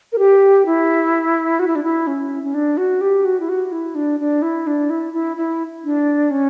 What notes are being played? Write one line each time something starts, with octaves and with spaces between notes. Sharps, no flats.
A#4
G4
E4
F#4
E4
D4
E4
C#4
C#4
D4
F#4
G4
F#4
E4
F#4
E4
D4
D4
E4
D4
E4
E4
E4
D4
C#4